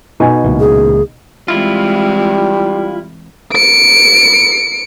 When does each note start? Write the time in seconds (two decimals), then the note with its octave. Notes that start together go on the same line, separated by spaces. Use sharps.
0.20 B2 D#4 G#5
0.44 C#2 A#2 E3
0.60 G#4
1.48 E3 G3 G#3 C4 E4 F4
3.52 C#7 D7